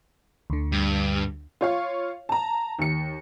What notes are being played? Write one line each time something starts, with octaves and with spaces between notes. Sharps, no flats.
D2 D3
G2
F4 C#5 F5
A5 A#5
D#2 C#7